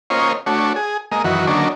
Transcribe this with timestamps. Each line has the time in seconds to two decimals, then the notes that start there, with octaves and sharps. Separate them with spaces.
0.10 A#3 C#4 F4 C5 C#5 D#5
0.46 A3 D4 F#4 C#5
0.76 G#4
1.12 G#3 A#3 D#5
1.24 F#2 D#3 E3 F#4
1.47 D3 D#3 F#3 A#3 C#4 D4